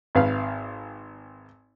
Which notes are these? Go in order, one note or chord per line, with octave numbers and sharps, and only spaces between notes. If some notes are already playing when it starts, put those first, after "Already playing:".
G#1 B4 F5